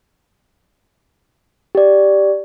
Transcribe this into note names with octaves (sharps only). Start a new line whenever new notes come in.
G4 D5